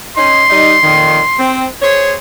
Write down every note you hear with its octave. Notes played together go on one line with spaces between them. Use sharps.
C#4 D#4 C6
G3 D#4
F2 A#2 D#3
C4
G#4 C5 C#5